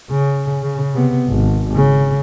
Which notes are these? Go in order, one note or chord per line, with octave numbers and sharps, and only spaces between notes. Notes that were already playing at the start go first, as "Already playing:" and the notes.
C#3
C#3
C3 B3
G#1
C#3